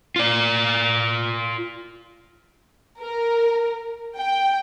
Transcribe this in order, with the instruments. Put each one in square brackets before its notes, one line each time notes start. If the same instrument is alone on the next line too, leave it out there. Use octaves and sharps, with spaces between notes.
[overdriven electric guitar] F4 D5
[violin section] A#4
G5